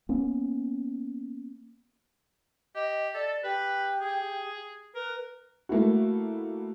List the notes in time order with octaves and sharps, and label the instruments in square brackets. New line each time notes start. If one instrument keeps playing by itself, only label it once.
[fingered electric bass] A#3 B3 C#4
[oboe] G4 [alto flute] D#5
[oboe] A4 [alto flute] D5
[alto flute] G4 [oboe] B4
[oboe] G#4
[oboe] A#4 [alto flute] B4
[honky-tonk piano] A3 A#3 E4 F#4